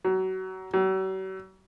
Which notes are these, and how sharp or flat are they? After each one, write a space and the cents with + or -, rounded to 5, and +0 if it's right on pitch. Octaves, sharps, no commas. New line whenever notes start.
F#3 +25
F#3 +45